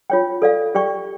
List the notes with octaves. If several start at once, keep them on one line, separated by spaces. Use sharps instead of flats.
F4 C#5 G5
A4 D5 F5
G4 D5 G5 C#6